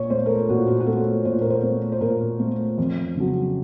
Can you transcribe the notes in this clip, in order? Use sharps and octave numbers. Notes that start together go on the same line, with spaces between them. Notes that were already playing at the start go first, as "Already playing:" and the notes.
Already playing: A#2 C#5
A3 C5
A#4
A4
A#2 F#4
F#4
F#4
A3 A4
A#2 C5
A#4
C5
A3
C5
A#2 A#4
A3
F2
C#3 F#3